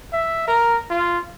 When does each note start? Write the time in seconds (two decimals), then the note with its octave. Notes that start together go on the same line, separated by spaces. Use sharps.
0.13 E5
0.48 A#4
0.90 F4